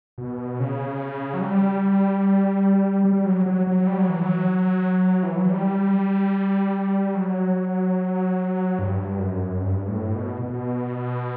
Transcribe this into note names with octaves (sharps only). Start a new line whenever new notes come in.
B2
C#3
F#3
G3
G3
F#3
F#3
F#3
G3
F#3
E3
F#3
E3
F#3
G3
F#3
G2
F#2
G2
A2
B2
B2